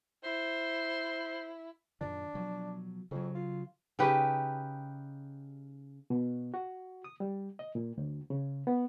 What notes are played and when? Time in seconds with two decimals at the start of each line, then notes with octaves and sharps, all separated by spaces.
0.24 E4 C5
2.01 F#2 A#2 D#3 D4
2.34 B2 F3 F#3
3.11 F2 C#3 F#3
3.35 F4
3.99 C#3 D#4 G4 B4
6.10 B2
6.54 F#4
7.04 D#6
7.20 G3
7.59 D#5
7.75 A#2
7.98 D2
8.30 C#3
8.67 B3